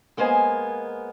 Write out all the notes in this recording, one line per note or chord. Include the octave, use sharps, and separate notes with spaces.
G#3 A#3 B3 C5 D#5 G#5